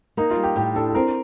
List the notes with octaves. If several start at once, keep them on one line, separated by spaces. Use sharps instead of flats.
A#3 D#4
F4
G3
G4
A2 G4
D4 A4
A4
C4 A#4